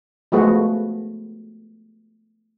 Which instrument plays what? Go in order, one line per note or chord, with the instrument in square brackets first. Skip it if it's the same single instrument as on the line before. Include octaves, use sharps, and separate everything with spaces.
[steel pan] F3 G#3 A3 B3 F#4